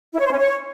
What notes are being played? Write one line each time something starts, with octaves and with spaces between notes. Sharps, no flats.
E4
C#5
C5
C#4
C#5